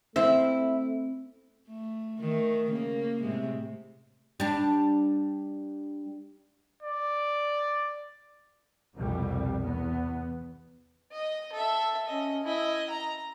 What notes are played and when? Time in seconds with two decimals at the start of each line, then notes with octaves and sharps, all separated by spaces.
0.16 A3 C4 E4 E5 F5
1.68 A3
2.20 D#3 A3
2.70 C#3 A#3
3.22 A2 C3 G#3
4.40 G3 D4
6.83 D5
8.97 C2 F2 B2 G3
9.63 E2 B3
11.12 D#5
11.52 A4 E5
12.07 C#4 D#5
12.45 E4 D#5
12.90 A#5